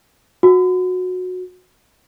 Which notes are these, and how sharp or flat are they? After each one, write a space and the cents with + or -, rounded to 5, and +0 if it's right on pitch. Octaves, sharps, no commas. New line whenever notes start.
F#4 -20